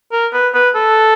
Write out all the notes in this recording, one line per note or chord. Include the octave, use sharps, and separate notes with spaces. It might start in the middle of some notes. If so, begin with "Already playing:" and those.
A#4
B4
B4
A4